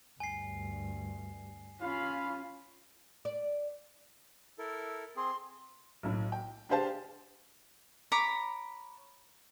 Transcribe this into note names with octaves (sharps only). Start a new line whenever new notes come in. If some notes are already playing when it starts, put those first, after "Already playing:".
D2 G2 G#5 C7
C#4 F4 F5 B5
D5
E4 A4 A#4
C4 G#4 C6
B1 A2
G5
D4 G4 G#4 C5 F5 A5
C#5 A#5 B5 D6